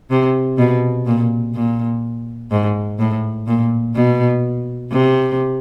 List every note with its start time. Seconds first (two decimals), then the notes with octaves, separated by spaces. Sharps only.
0.11 C3
0.58 B2
1.06 A#2
1.54 A#2
2.51 G#2
2.99 A2
3.47 A#2
3.95 B2
4.92 C3